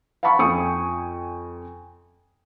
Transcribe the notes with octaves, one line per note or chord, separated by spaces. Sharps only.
F5 F#5 A5 B5 C#6
F2 G5 G#5 C#6 D#6 C#7